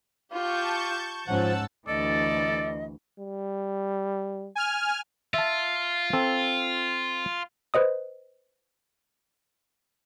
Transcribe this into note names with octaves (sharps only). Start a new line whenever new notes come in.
F4 G4 A5 C#6 G6
G#2 F3 C#4 F#5 A5 E6
D2 E3 A4 D5 D#5
G3
G#5 F6
F4 E5 A5
C4 A4
B4 C5 D#5 D#6